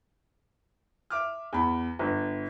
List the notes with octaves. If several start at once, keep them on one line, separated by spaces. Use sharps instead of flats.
E5 D6 F6
E2 B5
G1